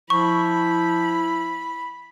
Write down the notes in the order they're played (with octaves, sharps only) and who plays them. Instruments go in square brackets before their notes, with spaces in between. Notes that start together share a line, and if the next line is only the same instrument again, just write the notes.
[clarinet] F3 [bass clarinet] E4 [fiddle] B5 [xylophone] C#6